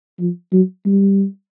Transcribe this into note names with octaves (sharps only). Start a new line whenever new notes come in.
F3
F#3
G3